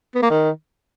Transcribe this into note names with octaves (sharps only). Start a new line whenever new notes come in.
B3
A#3
D#3